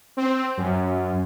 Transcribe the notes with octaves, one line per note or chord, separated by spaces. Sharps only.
C4
F#2